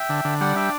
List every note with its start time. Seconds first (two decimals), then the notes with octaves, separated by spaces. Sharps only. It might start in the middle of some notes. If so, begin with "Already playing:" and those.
Already playing: E5 G5
0.09 D3
0.25 D3
0.41 G3 D5 F#5
0.56 D4 E5 G5